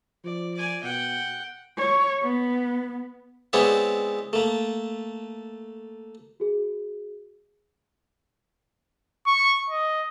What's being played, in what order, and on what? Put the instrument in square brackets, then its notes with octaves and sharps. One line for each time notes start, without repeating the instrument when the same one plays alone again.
[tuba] F3 [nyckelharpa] D5
[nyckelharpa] D5 G#5
[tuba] B2 [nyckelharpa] F#5 G5
[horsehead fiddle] C#5
B3
[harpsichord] G#3 B3 C4 E4 C#5 D5
A3 A#3
[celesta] F#4 G#4
[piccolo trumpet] C#6
D#5